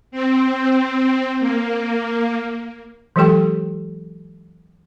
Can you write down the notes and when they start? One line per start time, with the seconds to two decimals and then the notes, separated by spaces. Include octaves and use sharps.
0.11 C4
1.40 A#3
3.16 E3 F#3 G#3 G4 A4 G5